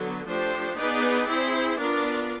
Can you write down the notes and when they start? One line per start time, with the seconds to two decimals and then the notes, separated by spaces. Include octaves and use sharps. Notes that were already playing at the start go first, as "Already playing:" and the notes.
Already playing: D3 F#3 B3
0.26 F3 A3 D4 G4 C5
0.76 B3 D#4 G#4 B4 D5
1.28 C4 E4 G#4 C5
1.78 B3 D4 F4 A#4 D5